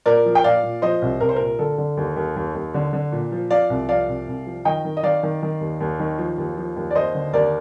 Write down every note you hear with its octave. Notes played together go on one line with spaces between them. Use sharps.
A#2 A#4 D5
F3
G5
A#2 D5 F5
A#2
F3 C5 D#5
C2
C2 A#4
C5
A#2 A#4
D3 A4
D3
D#2
D#2
D#2
D#2
D3
D3
A#2
F3
F3 D5 F5
C2
F3 D5 F5
C2
C2
F3
D#3 D#5 G5
D#3
D#5
D#3 D5 F5
D#3
D#3
D#2
D#2
D#3
F3
D#2
F3
D#2
D5
D#2 C5 D#5
D3
D#2 A#4 D5